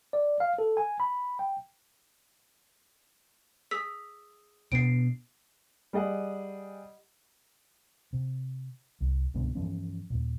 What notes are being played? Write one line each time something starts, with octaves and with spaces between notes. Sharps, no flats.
D5
F5
A4
G#5
B5
G5
G#4 E6 B6
B2 B3 D4 C7 D7
G3 G#4 D#5 F#5
C3
C2
C2 G2 B2 D3
G2 E3 F3 C#4
D#2 A#2